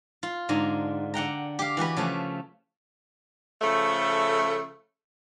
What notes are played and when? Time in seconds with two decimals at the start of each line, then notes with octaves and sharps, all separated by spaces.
0.23 F4
0.49 G#2 D3 A#5
1.14 D3 F#5 G5 A#5
1.59 G4 F5
1.77 E3 F#4 G4 B4
1.97 C#3 F3 A3
3.62 C#3 F3 A3